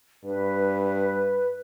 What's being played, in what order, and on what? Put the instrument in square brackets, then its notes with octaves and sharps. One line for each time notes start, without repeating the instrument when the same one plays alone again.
[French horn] G2 [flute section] B4